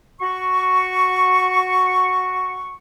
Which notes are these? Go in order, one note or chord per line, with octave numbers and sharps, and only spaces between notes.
F#4 C#6